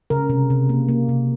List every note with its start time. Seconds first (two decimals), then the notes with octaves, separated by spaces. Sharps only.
0.10 C#3 A#4
0.30 C3
0.50 C3
0.69 A#3
0.89 A#3
1.09 C3